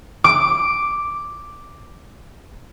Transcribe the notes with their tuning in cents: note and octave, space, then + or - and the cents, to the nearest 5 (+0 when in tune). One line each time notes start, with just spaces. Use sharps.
D6 +0